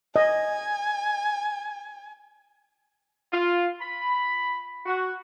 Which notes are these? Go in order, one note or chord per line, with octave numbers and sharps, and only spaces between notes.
D#5 G#5
F4
B5
F#4